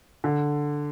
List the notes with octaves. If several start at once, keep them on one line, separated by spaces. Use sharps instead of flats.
D3